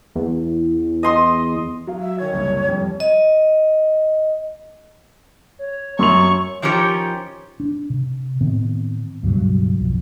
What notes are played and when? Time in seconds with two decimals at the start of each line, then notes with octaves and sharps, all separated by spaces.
0.15 E2
1.03 D#5 C6 D#6
1.87 F#3 F5
2.00 E5
2.18 D#3 C#5 G#6
2.32 F#1 C2
2.68 A1 F2 G3
3.00 D#5
5.59 C#5
5.99 F#2 C6 C#6 F7
6.62 D#3 F3 C#4 G4 C#5
7.60 D4
7.90 C3
8.41 A2 D#3 B3 C4
9.23 C#2 G2 B2 F#3
9.80 B1 F2